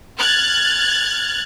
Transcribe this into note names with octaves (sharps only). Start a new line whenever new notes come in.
F6 F#6 G#6 A6